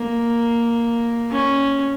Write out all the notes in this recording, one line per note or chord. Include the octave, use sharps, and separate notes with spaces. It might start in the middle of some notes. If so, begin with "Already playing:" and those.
Already playing: A#3
C#4